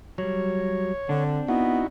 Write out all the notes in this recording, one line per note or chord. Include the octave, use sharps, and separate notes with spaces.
F#3 G3 C#5
D3 C4 D4
B3 D#4 E4 F#4